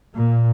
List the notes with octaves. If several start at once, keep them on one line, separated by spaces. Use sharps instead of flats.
A#2